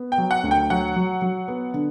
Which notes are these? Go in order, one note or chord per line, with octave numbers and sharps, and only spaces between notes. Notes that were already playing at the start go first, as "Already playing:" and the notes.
Already playing: B3
G5
F#3
F#5
D2
G5
F#3 F#5
F#3
F#3
B3
D3